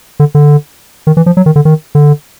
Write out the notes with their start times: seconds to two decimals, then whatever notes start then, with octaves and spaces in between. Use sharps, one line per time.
0.20 D3
0.35 D3
1.07 D#3
1.17 E3
1.26 F3
1.37 F#3
1.46 D#3
1.56 D3
1.65 D#3
1.95 D3